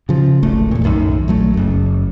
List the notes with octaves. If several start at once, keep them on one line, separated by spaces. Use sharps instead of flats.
C#3 F3
D1 G#1 A3
E2 A#2
B1 F#2 A2 D#3
A#1 F#3 A3
F#1 F#2